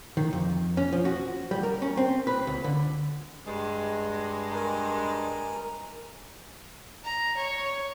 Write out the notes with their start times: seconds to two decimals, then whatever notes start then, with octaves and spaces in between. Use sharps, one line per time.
0.17 D#3
0.33 F2
0.77 C#4
0.93 F3
1.05 F#4
1.51 G3
1.63 A#4
1.82 C#4
1.97 C4
2.27 B4
2.47 C#2
2.64 D3
3.46 G2 G#3
4.52 A#4 G#5 A#5
7.03 A#5
7.36 C#5